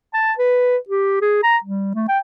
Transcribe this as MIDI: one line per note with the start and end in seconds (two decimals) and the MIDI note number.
0.14 0.33 81
0.38 0.77 71
0.89 1.18 67
1.22 1.39 68
1.43 1.57 82
1.64 1.93 55
1.95 2.06 57
2.08 2.19 79